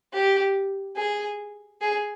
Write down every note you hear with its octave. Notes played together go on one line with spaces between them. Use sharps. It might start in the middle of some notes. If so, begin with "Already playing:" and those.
G4
G#4
G#4